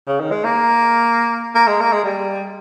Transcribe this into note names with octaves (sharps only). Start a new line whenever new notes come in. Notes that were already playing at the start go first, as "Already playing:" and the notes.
C#3
D#3
G#3
A#3
A#3
G#3
A#3
G#3
G3